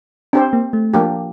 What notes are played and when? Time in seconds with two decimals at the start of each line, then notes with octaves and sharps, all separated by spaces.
0.33 C4 D4 G4 C5
0.53 A#3
0.73 A3
0.93 F3 A#3 D4 G4